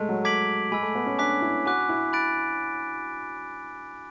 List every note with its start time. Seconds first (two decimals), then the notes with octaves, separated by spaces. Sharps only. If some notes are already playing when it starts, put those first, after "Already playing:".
Already playing: G#3 A3
0.09 F#3
0.24 A3 D6 G#6 B6 D7 F#7
0.72 G#3 G#5 B5 E6
0.83 A3
0.95 B3
1.06 C#4
1.18 D4 G#5 D6 F#6 B6
1.42 E4
1.65 F#4 G#5 D6 F#6
1.89 E4
2.13 B5 F#6 A6 D7